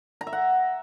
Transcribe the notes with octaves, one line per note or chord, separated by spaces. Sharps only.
A#5
E5
F#5